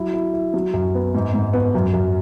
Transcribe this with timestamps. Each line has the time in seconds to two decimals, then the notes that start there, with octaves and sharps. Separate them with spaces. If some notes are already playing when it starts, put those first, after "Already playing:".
Already playing: F#3 E4
0.14 E4
0.34 E4
0.54 F#3
0.74 F#2
0.95 B3
1.15 G#2
1.34 G#2
1.53 B3
1.75 F#2
1.94 F#2